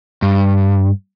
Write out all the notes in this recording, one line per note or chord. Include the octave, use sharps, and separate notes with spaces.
G2